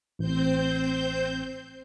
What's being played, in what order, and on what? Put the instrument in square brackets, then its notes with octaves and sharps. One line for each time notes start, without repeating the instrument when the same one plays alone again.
[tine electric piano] A1 [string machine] C4 C5 G6